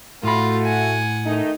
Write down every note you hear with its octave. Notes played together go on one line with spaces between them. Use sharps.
A2 A3 F4 F#4 B5
F#5 G#5
D#3 A3 D#4